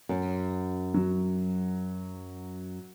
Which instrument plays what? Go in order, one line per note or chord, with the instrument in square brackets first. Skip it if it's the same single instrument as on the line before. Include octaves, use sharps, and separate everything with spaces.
[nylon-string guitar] F#2
[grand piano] F#3